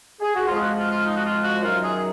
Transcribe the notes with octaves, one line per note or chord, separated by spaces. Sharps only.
G#4
F#4
F2 F3 G#3 F4
G#4
F#4
F4
F4
D#4
F#4
F4
F#4
F#2 D#3 F#3 F4
G#4